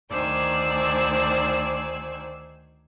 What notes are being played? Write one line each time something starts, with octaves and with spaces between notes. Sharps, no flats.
D2 D#3 C5 D5 G#5 E6